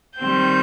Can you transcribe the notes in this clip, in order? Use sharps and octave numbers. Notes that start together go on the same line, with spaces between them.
D#3 G3 C4 G6